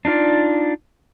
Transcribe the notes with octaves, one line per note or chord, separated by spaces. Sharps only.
D4 D#4 F4 D5